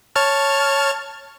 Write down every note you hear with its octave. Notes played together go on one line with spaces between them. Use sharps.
C#5 A5 F6